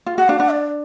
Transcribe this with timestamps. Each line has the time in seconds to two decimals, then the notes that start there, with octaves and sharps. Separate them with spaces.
0.06 F4
0.18 F#4 F#5
0.28 D4 F5
0.39 D4 F#5
0.50 D5